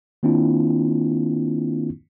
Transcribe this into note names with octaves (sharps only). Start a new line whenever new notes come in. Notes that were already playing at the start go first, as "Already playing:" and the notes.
D#3 A#3 C4 D4 E4 F4